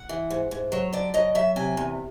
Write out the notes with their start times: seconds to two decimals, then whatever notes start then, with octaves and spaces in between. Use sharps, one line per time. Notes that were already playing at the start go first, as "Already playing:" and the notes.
Already playing: F#5
0.09 E3
0.30 G#2
0.51 G#2
0.72 F#3 C#5
0.93 D3 D5
1.14 F#3 D#5
1.35 F#3 E5
1.56 C3 G#5
1.77 E2